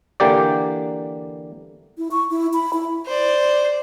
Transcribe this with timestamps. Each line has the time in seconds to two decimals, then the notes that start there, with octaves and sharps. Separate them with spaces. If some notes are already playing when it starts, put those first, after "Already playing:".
0.20 D3 E3 A#3 G4 D5
1.98 E4
2.11 C#6
2.31 E4
2.53 B5
2.73 E4
3.06 C5 D5